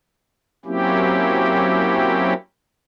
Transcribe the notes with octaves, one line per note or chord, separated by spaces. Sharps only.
F#3 A#3 C4 C#4 E4 G4